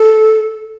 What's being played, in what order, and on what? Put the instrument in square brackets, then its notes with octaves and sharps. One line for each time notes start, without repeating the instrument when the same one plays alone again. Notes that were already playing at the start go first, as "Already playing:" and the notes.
Already playing: [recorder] A4